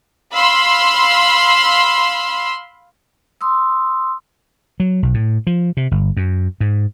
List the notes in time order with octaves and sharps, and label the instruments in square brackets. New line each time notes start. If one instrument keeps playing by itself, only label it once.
[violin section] F5 B5 C6 E6
[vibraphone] C6 D#6 E6
[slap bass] F#3
B1
A2
F3
C3
G1
F#2
G#2